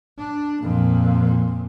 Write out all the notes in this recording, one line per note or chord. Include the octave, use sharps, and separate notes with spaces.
D4
F2 A#2